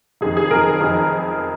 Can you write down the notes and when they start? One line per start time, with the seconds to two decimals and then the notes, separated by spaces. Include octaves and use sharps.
0.21 F1 F2 D#3 G#4
0.37 G#4
0.50 F1 F2 D#3 A#4
0.80 F1 F2 D#3